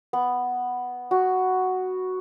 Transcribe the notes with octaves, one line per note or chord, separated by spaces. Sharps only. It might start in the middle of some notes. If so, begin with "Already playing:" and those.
B3
F#4